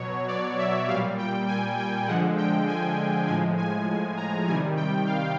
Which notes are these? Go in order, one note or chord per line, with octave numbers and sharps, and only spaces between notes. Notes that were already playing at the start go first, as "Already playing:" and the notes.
Already playing: B2 F#3 C#5
D5
E5
A#2 G3 F5
G5
G#5
G5
D3 F3 G#3 F#5
G5
G#5
A2 F3 G#3 G#5
G#5
A#5
C3 D#3 G3 G#5
G5
F5